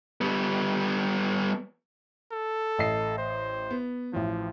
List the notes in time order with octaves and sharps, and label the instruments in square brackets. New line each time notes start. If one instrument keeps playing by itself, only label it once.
[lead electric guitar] G3 B3
[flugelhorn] A4
[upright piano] A1 D#5 C7
[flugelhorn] C5
[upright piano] B3
[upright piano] A1 E3 [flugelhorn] F3